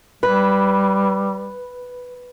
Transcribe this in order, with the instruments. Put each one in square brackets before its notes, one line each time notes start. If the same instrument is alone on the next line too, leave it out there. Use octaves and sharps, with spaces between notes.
[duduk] G3 [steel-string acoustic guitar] B4